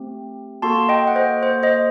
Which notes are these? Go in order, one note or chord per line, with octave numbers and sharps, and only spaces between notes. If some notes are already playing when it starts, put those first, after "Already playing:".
Already playing: A3 C4 G4
A#3 F#4 A4 A5 C6
D#5 G5
F#5
C5 D#5
C5
C5 D#5